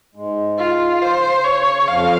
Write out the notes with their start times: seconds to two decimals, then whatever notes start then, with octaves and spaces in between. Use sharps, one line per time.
0.15 G#2 G#3
0.58 F4
1.02 C#3 C5
1.44 C#5
1.87 F2 F3 F5